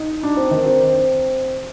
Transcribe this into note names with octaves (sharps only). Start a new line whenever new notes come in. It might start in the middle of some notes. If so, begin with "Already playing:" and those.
Already playing: D#4
D4
C4
D#3
C4